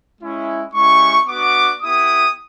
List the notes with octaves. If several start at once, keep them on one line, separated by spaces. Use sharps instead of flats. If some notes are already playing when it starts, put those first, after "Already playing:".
G#3 C#4 E4
G#3 C#4 E4 G4 C#6
B3 D4 F#4 D6
B3 E4 G4 D#6